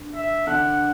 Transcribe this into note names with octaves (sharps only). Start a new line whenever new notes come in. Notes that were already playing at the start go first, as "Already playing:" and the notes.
Already playing: D3
E5
D3 D4 F#5